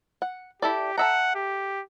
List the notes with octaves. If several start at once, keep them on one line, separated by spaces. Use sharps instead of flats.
F#5
E4 G4 A4 D5
A4 E5 F#5 A#5
G4